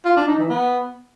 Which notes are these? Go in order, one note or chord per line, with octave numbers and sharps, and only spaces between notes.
F4
D4
D#4
E3
B3